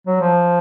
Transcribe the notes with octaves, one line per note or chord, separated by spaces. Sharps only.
F#3
F3